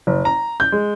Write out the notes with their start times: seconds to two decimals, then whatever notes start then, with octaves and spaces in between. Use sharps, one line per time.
0.07 F#1
0.25 A#5
0.60 G6
0.72 G#3